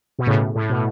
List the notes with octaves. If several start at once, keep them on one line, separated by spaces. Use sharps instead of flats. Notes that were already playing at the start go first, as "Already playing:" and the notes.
B2
A2 C#3
A2
B2